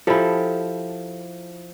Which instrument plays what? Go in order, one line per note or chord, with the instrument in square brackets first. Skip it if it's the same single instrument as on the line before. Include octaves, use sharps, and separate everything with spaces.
[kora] F3 E4 [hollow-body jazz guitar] G4 A4